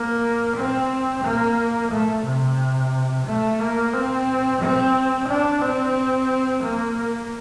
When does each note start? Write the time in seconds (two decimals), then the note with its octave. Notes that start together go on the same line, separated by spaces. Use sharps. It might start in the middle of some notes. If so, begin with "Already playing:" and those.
Already playing: A#3
0.56 C4
1.24 A#3
1.92 A3
2.25 C3
3.26 A3
3.60 A#3
3.94 C4
4.61 C4
5.29 D4
5.62 C4
6.63 A#3